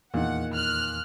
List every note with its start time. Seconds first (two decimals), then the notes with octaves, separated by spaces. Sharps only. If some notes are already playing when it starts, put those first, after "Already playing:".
0.14 E2 A#2 D#3 F#5
0.54 F6 F#6